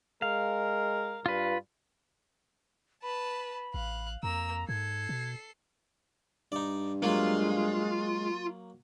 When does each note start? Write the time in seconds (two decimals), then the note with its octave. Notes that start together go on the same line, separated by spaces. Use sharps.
0.22 G#3 A#4 F5
1.26 G2 F4 B4
3.03 B4 A5 B5
3.74 A1 F5 F#6
4.23 F2 A#3 A#5 E6
4.69 G#2 A4 G#6 C7
5.09 B2
6.52 G2 D#4 D5
7.03 F#3 G#3 A#3 F4